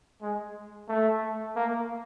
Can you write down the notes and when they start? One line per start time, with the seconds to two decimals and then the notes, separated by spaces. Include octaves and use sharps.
0.22 G#3
0.89 A3
1.56 A#3